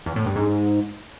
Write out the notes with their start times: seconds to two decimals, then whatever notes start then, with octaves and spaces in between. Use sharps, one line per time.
0.06 E2
0.16 A2
0.26 G2
0.36 G#2